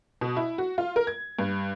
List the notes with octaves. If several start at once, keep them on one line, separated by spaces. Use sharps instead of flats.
B2
E4
F#4
F4
A#4
G#6
G2